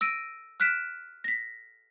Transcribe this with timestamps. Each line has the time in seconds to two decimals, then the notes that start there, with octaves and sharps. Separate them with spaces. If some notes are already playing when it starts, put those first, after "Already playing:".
0.01 E6 A#6 D7 D#7
0.60 F6 F#6 B6 D7 E7
1.24 A#6 B6